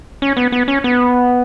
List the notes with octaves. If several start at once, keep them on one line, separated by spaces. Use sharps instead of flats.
C#4
B3
B3
C#4
B3